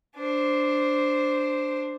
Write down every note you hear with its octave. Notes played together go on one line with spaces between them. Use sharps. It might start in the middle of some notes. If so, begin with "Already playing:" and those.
D4 C5